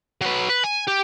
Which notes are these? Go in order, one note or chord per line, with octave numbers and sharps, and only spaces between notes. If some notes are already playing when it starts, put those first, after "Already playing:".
F#3 B4
B4
G#5
G4